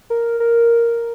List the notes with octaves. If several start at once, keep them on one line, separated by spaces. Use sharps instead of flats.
A#4
A#4